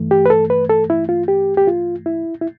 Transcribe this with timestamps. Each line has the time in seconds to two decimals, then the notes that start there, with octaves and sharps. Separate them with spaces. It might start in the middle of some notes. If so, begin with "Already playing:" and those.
Already playing: G2 E3 A3
0.11 G4
0.26 B4
0.30 A4
0.50 B4
0.69 A4
0.90 E4
1.09 F4
1.28 G4
1.57 G4
1.67 F4
2.06 E4
2.41 E4